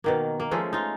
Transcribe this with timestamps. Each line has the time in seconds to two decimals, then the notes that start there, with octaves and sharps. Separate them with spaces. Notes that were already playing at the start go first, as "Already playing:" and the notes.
0.04 B2 D#3 A#3
0.40 A#3
0.51 F3 G#3 A3 C#4
0.73 D#4 F4